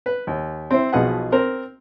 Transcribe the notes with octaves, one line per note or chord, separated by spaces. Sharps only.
B4
D#2
C4 E4 C5
B1 B2 F3 G#4 B4 F#5
C4 A#4 C5